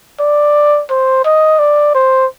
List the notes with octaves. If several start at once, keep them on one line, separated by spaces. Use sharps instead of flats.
D5
C5
D#5
D5
C5